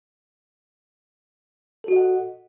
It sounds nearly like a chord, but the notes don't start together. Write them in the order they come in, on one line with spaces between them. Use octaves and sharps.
A4 F#4 D#5 F#5